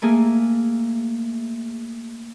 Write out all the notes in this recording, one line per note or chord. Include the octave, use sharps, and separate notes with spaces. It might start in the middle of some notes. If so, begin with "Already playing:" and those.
A3 A#3 G#4